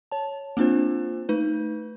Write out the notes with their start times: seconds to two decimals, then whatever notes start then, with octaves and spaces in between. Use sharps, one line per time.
0.12 C#5 A5
0.57 A#3 C4 D4 F4 C5
1.29 A3 D#4 B4